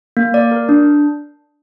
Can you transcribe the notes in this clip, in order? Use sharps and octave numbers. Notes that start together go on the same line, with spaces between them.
A#3
D5
A#4
D4